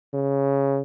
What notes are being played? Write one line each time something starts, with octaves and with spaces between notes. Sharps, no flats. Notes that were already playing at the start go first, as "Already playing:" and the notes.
C#3